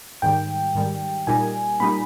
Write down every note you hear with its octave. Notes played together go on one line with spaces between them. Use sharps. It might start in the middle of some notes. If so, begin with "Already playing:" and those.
G#2 D#3 G3 G5
G#2 D#3 G3
A#2 G3 A#3 D#4 G#5
A#2 G3 A#3 D#4 B5